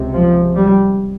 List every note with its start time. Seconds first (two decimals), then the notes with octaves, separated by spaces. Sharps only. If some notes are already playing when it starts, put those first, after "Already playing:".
Already playing: C#2 C3
0.13 F3
0.56 G3